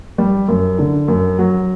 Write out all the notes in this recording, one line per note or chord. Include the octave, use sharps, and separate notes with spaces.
G3
F#2
D3
F#2
F#3